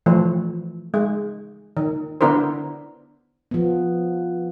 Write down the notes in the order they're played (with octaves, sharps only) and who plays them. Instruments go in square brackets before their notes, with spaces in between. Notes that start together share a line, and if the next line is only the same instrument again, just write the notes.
[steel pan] E3 F3 A3
G#3
D#3
D3 B3 D4 E4 A#4 C5
[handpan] F3 B3